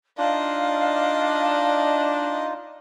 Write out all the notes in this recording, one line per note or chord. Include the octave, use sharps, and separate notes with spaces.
D4 D#4 F4 D5 D#5 F5